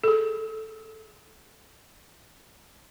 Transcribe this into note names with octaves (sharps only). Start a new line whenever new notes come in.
G#4 A4